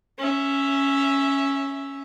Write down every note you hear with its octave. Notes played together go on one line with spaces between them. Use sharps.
C#4 E5